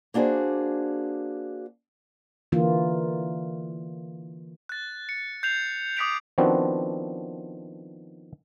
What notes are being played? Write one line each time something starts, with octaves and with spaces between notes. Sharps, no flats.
A#3 D4 F#4 G#4 C5
D3 E3 A#3 F4
F#6 A6
C#7
G6 C7 F7
D6 D#6 G6 B6 D7 F7
D#3 F3 B3 C4 D4 F#4